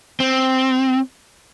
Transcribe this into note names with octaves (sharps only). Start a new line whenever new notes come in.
C4